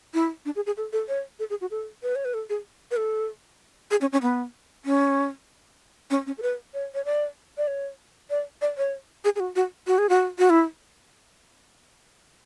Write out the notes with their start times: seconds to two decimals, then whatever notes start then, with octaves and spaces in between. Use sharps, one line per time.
0.14 E4
0.45 D4
0.56 G#4
0.66 G#4
0.77 A4
0.93 A4
1.08 C#5
1.39 A4
1.50 G#4
1.61 F#4
1.71 A4
2.03 B4
2.16 C#5
2.25 B4
2.34 A4
2.50 G#4
2.91 B4
2.97 A4
3.91 G#4
4.01 C#4
4.12 C#4
4.22 B3
4.85 C#4
6.10 C#4
6.27 C#4
6.38 A4
6.42 B4
6.74 C#5
6.94 C#5
7.05 D5
7.58 D5
7.67 C#5
8.30 D5
8.62 D5
8.78 C#5
9.24 G#4
9.36 G#4
9.40 F#4
9.56 F#4
9.87 F#4
9.98 G#4
10.09 F#4
10.39 F#4
10.50 E4